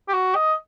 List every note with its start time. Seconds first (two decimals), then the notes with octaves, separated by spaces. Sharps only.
0.08 G4
0.13 F#4
0.35 D#5